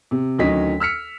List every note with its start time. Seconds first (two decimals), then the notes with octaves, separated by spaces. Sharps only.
0.11 C3
0.39 D2 D#3 F#3 C#4 D#5 B6
0.80 E6 F6 B6 C#7